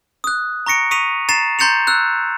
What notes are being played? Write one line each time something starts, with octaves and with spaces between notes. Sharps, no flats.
D#6 F#6
A#5 C#6 A#6 C#7 D7
C#6 D#6 B6 D#7 F7
A#5 A6 C7 E7
A#5 C6 G6 A6 C#7 F7
E6 F#6